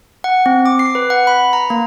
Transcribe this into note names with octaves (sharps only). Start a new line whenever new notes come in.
F#5
C4
D6
C7
B4
F#5
B5
A#5
A#3